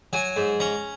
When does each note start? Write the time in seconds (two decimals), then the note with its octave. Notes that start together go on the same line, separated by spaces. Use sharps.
0.13 F#3 G#5
0.36 G#2
0.60 C#4 A#5